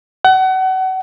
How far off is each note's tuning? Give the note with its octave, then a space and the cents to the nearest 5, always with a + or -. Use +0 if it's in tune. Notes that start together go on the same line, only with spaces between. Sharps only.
F#5 +30